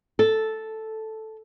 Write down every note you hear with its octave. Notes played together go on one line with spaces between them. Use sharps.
A4